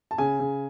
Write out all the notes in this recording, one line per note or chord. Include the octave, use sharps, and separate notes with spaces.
A5
C#3 G#5
C#3